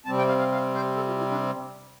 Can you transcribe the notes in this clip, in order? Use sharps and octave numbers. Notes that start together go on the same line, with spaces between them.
C3 G3 C4 A5
G5
F5
F5
F5
C5
A4
F4
E4
D4